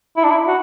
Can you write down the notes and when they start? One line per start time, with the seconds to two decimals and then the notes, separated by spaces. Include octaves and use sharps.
0.17 E4
0.24 D4
0.30 E4
0.47 F#4